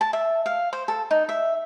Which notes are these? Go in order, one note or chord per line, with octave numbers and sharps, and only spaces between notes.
A5
E5
F5
C5
A4
D#4
E5